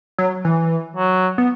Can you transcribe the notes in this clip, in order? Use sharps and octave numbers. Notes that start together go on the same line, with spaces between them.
F#3
E3
F#3
B3